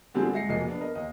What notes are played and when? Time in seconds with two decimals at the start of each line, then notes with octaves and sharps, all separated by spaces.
0.14 A#2 D3 G3 C4 G4 G#4
0.33 G#3 E5 A#6 C7 C#7
0.49 F1 B1 A#3 G#4 D#5 C7
0.68 B3 D4
0.81 A#4 D#5
0.95 D#2 D#5